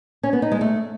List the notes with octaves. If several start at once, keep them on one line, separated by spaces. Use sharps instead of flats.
C#4
B3
D#4
G#3
A3